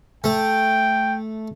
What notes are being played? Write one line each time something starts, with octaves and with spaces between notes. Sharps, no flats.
A3 G5